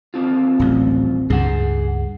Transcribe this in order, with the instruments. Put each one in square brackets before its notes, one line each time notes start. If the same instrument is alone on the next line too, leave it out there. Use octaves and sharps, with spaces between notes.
[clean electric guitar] D#2 C4 F4
[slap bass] D1 A1 G3
[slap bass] C#2 G2 [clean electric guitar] G#4 F#5